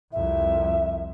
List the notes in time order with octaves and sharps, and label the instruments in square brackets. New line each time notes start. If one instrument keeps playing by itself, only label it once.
[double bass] C2 F2 [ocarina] E5